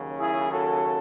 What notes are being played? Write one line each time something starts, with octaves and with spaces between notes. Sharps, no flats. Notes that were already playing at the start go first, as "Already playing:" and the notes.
Already playing: D#2 C#3 F#3
E4 G#4
F#4 A4